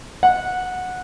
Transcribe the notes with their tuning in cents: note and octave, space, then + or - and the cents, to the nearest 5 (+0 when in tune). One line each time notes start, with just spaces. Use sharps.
F#5 -15